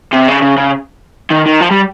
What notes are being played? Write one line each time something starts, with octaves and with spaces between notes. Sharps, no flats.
C3
C#3
C#3
C#3
D#3
D#3
F3
G3